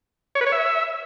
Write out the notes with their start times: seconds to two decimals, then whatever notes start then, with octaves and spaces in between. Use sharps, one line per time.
0.35 C#5
0.41 B4
0.47 C#5
0.52 E5